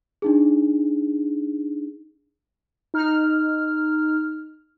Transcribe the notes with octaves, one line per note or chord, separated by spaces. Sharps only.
D4 D#4 G#4
D#4 F6